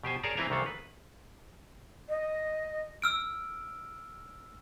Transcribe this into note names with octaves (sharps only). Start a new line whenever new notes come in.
B2 G4 C5 G#5
G#4 A#4 C#5 D5 A5 A#5
E3 C4 E4 B4 G#5 A#5
C2 D#3 E3 A4 F5
B4
D#5
E6 F6 D7